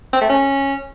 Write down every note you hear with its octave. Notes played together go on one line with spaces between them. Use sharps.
C4
A3
C#4